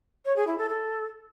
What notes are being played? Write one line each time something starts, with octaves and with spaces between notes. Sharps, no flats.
C#5
G#4
E4
A4
A4